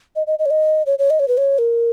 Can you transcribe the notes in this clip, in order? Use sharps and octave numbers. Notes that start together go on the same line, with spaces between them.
D#5
D#5
D#5
C#5
D#5
C#5
C#5
D#5
C#5
B4
C#5
A#4